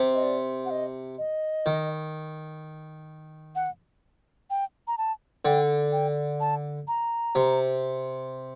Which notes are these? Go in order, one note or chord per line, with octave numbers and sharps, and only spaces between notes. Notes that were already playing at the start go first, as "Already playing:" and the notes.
Already playing: C3
D#5
D5
F#5
D#5
D#5
D#3
F#5
G5
A#5
A5
D3 G5
G5
A5
A#5
C3